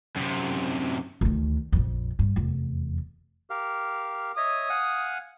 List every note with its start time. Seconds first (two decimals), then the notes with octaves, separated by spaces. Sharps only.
0.17 F#2 C3
1.21 D2 D#3
1.72 A#1 F2
2.19 G2
2.36 F1 E2
3.50 G4 A#4 F5
4.37 C#5 D#5 E5 D#6
4.70 F5 F#5 G#5